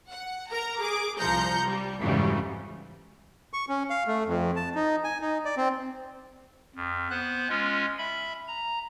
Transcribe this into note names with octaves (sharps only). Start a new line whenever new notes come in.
F#5
A#4 A#5
G#4 D6
C2 F3 A#5 G6 C#7
G3
F2 G#2 C#3 E3 F#3 G3
C#6
C#4
F5
A3
F2
A5
D#4
G#5
D#4
D5
C4
F2
B3 C5 F#6
G#3 C#4 F4
E5 B5
A#5